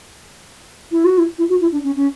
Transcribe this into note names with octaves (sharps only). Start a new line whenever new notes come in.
E4
F#4
E4
E4
F#4
E4
D4
C#4
C#4